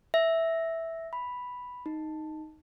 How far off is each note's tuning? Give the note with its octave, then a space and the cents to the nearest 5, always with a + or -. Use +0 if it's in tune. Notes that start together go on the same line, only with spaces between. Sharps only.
E5 -5
B5 +0
D#4 +0